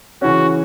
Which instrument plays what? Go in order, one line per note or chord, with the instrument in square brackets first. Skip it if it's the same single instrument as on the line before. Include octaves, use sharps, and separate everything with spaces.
[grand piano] C#3 E3 C#4 [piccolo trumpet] F#4